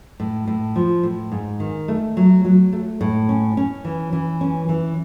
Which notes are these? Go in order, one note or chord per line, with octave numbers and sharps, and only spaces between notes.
A2
A2
F3
A2
G#2
D#3
A3
F#3
F#3
A3
A2
C#4
C#4
E3
E3
C#4
E3